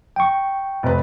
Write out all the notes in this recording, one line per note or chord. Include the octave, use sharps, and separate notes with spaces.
G5 C#6
F1 B4